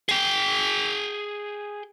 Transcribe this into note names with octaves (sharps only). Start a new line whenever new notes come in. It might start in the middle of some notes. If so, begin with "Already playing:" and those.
G#4 G5